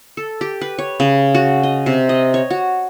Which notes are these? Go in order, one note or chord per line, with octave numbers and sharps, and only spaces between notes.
A4
G4
B4
C#5
C#3
F#4
D#5
C3
D#5
C#5
F#4